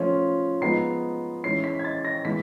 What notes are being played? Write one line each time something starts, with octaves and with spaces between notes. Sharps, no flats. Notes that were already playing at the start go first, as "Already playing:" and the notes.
Already playing: F3 A3 C#4 F4
F3 G#3 B3 D#4 C7
E3 G#3 C#4 E4 C7
B6
G#6
A6
A#6
E3 G#3 B3 B6